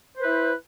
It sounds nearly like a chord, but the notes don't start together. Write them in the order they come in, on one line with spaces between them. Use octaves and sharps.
C5 B4 E4